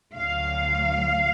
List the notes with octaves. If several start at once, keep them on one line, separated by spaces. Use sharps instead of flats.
D2 D3 F#3 F5